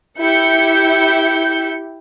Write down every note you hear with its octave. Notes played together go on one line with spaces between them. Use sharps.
E4 G4 G6 C#7